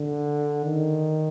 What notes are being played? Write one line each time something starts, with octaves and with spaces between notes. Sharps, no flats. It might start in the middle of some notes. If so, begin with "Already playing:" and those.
Already playing: D3
D#3